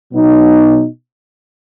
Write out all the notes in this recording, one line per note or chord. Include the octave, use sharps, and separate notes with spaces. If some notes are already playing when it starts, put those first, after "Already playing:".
B2 F#3 B3 D#4